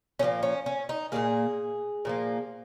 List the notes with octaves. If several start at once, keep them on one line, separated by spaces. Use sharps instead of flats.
A#2 F3 A#3 C#4
C#4
C#4
D#4
A#2 F3 A#3 G#4
A#2 F3 A#3